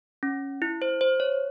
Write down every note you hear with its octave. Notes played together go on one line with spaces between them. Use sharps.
C#4
E4
C5
C5
C#5